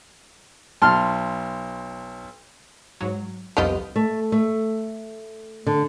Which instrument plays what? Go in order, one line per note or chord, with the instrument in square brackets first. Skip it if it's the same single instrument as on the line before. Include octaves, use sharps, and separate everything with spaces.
[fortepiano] B1 C6 F6 [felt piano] A5
[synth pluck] G#2 F#3
[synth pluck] C2 F2 F4 [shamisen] B3 G4 D#5
[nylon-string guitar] A3
A3
D3